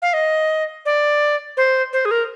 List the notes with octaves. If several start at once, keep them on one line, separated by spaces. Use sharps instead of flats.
F5
D#5
D5
C5
C5
G#4
A#4